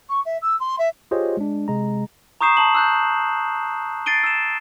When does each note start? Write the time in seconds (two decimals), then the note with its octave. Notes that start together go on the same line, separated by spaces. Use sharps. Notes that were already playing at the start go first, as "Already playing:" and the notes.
0.09 C#6
0.25 E5
0.41 E6
0.59 C6
0.78 E5
1.11 F4 G4 G#4 C5 C#5 D#5
1.37 G#3 D4
1.68 C3 G#3 A#5
2.41 A#5 C#6 D#6 G6 C7 E7
2.57 A5 F#7
2.75 E6 F#6 G6
4.06 A6 C7 D7 D#7 G7
4.24 E6 E7